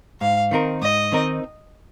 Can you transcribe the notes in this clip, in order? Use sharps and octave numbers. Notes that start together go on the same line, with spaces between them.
G#2 F5
D#3 C4 D#4 A#4
G#2 D#5
D#3 C4 D#4 A#4